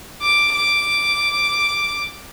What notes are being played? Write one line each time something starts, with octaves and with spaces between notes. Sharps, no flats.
D6
D6